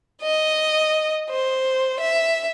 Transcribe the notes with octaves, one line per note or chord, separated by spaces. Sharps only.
D#5
C5
E5